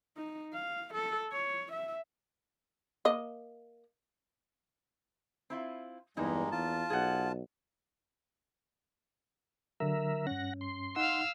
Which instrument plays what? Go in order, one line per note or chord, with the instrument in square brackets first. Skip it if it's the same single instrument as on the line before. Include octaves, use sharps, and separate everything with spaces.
[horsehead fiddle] D#4
F5
A4
C#5
E5
[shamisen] A#3 D#5
[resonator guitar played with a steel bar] C4 E4 F4
[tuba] E2 [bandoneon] G2 G#3 [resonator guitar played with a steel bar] A#3 C#4 D#4
[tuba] E2 [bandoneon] F4 A5
[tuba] B1 [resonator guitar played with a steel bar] G#4 F#5
[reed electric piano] D3 F#3 [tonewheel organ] A#4 E5
[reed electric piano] G2 C#4 [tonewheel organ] F#5 A#6
[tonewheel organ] C6
[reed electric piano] D#4 F#5 [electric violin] F5 E6